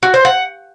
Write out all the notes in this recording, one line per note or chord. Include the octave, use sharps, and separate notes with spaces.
F#4
C5
F#5